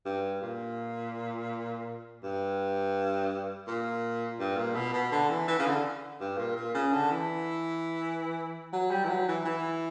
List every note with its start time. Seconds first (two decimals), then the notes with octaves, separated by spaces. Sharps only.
0.05 G2
0.42 A#2
2.23 G2
3.67 A#2
4.39 G2
4.57 A#2
4.75 B2
4.93 B2
5.11 D3
5.30 E3
5.48 E3
5.59 C#3
5.66 D3
6.20 G2
6.38 A#2
6.56 A#2
6.74 C#3
6.93 D3
7.11 E3
8.73 F#3
8.91 G3
9.04 E3
9.09 F#3
9.28 E3
9.45 E3